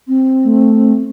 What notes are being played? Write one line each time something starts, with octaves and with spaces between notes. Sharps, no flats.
C4
A3